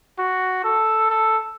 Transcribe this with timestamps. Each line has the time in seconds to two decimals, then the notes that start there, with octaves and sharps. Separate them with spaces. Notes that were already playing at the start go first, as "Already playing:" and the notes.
0.19 F#4
0.64 A4
1.10 A4